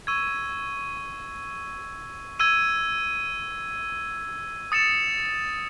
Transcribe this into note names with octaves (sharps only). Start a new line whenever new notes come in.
C#6 E6 G#6 D#7
E6 G#6 D#7
D#6 A6 C#7 E7